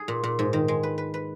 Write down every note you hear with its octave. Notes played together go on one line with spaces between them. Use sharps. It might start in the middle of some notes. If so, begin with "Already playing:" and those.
Already playing: G#4
A#2
A#2
G#2
D#3
G#3
B4
B4
B4